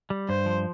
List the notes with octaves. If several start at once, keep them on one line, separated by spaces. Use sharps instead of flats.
G3
G2 C5
F3